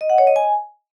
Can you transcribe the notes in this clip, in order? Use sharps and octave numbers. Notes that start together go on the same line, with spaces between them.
D#5
F#5
C#5
D#5
G#5